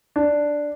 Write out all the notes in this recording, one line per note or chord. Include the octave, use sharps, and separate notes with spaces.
D4